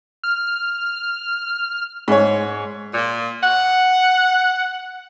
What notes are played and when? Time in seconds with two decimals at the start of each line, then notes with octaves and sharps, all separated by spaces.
0.23 F6
2.08 G#2 C#5
2.93 A#2
3.42 F#5